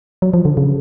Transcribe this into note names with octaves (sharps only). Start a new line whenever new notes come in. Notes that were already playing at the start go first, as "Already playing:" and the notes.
F#3
F3
D3
C#3